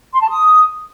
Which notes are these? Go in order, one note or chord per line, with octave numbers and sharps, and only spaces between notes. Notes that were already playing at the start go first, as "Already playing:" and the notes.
C6
A5
D#6